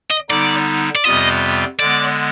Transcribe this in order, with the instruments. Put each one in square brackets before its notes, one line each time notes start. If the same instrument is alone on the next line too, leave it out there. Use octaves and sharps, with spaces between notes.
[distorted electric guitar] D#5
[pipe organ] D3 G3 B3 D#4 [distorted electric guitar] D5
[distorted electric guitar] D5
[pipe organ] F2 C3 G3 B3 F4 [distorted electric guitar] D#5
[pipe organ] D3 G#3 B3 [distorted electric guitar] D5